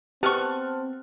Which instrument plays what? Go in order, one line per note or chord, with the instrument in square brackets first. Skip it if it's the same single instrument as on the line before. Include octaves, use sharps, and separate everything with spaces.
[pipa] B3 C#6 [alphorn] C4 [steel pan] G4 [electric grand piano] A5 F6 F#6